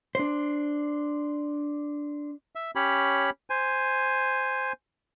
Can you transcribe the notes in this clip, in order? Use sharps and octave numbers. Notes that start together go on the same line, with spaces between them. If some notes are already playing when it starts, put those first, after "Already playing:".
D4 C5
E5
C#4 G4 C#5 B5
C5 G#5